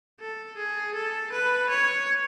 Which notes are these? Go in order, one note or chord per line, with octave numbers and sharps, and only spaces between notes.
A4
G#4
A4
B4
C#5